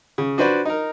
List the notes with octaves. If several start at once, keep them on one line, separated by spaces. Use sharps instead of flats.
C#3
D4 F#4 B4 C5 D5
D#4 A#4